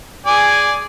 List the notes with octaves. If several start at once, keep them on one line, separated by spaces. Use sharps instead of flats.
G#4 D5 G#5